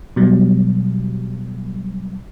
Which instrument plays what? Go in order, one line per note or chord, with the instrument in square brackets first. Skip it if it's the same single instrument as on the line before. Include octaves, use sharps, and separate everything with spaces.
[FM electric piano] B2 F#3 G3